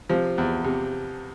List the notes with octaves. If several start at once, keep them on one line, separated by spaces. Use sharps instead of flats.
C3 F3
E2
C3